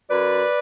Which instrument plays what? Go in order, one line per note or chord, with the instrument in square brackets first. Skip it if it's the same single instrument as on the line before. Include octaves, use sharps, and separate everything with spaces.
[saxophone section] F#2 B4 D5